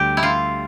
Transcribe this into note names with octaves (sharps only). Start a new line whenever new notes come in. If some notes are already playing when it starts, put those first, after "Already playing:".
Already playing: D2 D3 G3 G4
E4
F4